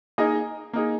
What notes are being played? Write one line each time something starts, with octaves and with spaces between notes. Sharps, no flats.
A#3 D#4 G#4 D#5
A#3 D#4 G#4